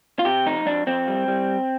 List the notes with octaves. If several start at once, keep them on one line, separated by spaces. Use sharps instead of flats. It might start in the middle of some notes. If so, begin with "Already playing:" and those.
F4
C3 G4
F2 D#4
F2 D4
F2 C4
G3
G3